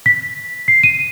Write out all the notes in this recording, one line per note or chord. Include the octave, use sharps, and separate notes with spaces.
B6
C7
D#7